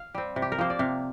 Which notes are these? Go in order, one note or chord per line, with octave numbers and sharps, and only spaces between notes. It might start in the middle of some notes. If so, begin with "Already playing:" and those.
Already playing: F5
G3 C4
C3
G4
A#4
F3 A#3 C5
D5
C3 F5